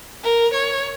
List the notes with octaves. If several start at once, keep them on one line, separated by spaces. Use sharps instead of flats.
A#4
C#5